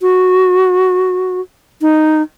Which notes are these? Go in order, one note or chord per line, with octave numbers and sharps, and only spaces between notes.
F#4
D#4